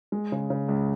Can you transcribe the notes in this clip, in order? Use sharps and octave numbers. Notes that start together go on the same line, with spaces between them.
G#3
C#3
C#3
C#2